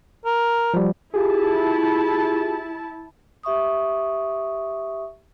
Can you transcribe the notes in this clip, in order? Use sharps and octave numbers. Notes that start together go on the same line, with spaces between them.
A#4
F3 G3
E4 F4 G4 G#4 A5
G4 E5 C#6 D#6